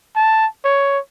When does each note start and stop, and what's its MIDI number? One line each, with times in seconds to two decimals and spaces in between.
0.16 0.47 81
0.65 0.99 73